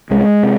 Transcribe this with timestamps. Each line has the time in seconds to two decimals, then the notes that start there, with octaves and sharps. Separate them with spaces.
0.10 C2 G#3
0.43 C3